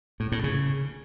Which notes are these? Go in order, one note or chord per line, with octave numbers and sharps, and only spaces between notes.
A2
A2
C#3